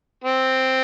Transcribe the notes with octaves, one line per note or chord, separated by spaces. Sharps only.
C4